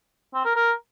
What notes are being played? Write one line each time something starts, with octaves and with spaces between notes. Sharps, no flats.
C4
A#4
A#4